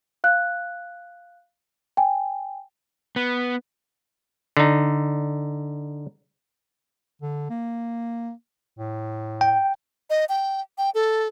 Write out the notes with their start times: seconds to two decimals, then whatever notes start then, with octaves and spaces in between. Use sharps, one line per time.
0.24 F5 F#6
1.97 G5 G#5
3.16 B3
4.57 D3 D#4
7.22 D3
7.50 A#3
8.79 A2
9.41 G5
10.10 D#5
10.29 G5
10.78 G5
10.95 A4